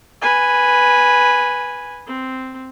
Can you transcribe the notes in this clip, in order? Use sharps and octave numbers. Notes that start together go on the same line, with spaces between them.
B4 G#5
C4